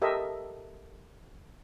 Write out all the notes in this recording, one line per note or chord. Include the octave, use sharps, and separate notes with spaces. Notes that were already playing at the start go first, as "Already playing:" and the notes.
G4 A4 A#4 D#5 E5